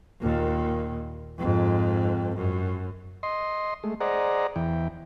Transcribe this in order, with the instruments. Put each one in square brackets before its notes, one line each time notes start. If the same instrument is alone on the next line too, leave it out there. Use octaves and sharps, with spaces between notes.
[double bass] D#2 A#2
F2 G#2
F#2
[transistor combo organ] D#5 C6
G#3 A3
G#4 C5 D5 D#5 F#5 A#5
E2 E3 G5